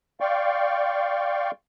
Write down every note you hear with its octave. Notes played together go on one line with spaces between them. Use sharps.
D5 F5 G5 C6 C#6